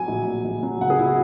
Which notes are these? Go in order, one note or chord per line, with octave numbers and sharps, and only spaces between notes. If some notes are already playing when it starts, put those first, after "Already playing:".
Already playing: F#3 G#5
A#1
A#2
A#1
F#3
C#2 F#5
G#4
B2 E4
F#4